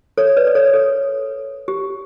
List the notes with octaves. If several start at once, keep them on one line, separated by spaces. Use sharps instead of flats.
A4 C#5
B4 D5
D5
A4 C#5
A4
G4